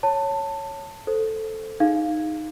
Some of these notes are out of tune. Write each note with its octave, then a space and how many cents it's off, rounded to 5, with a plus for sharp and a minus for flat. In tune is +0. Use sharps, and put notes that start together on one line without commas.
C#5 +0 A5 +15
A4 +0 C5 +0
D#4 +0 G#4 +5 F5 +0